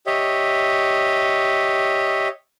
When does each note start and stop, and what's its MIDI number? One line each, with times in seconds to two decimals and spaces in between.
0.07 2.28 67
0.07 2.28 73
0.07 2.28 75
0.07 2.28 76